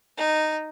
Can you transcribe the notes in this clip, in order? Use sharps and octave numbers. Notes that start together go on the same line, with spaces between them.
D#4